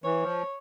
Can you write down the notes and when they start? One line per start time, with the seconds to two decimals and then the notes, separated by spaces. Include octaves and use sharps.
0.04 E3 C#5
0.23 F3